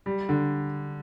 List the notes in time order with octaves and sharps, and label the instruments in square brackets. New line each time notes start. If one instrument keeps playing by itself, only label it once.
[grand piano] G3
D3